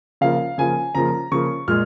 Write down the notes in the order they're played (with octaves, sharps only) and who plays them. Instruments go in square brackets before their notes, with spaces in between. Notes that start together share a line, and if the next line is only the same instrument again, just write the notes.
[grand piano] C#3 F3 A#3 F5
C#3 F3 A#3 G#5
C#3 F3 A#3 A#5
C#3 F3 A#3 C#6
A#2 G#3 F6